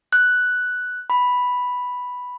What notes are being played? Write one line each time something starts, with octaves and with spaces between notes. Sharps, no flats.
F#6
B5